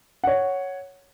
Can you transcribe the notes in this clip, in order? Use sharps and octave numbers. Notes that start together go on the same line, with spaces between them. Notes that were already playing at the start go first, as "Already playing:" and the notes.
C#5 F#5